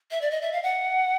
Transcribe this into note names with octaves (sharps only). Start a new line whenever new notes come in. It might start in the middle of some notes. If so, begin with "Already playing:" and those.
E5
D5
D#5
E5
F5
F#5